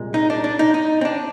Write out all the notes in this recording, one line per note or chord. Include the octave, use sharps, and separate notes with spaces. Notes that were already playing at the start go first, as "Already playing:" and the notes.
Already playing: C2 A#2 G#3
D#4
D4
D4
D#4
D#4
C4
D4